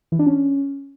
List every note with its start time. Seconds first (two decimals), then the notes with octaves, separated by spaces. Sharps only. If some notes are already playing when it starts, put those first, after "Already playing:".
0.12 E3
0.19 D4
0.26 C#4